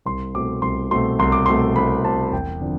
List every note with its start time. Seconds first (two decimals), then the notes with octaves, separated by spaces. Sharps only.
0.06 C2 C6
0.34 B2 A3 C4 D6
0.62 C2 C6
0.91 B2 A3 C4 C6
1.19 C2 C6
1.32 D6
1.46 B2 A3 C4 C6
1.76 C2 B5
2.04 B2 A3 C4 A5
2.32 E1 G5
2.61 D3 F3 C4